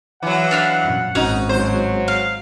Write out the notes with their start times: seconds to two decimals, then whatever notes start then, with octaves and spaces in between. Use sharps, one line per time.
0.23 E3 F#3 F#5
0.51 D4 F5 B5
0.84 F#2 A#2
1.15 G#1 C#4 D#4 F#4
1.49 F#3 C5
2.08 F5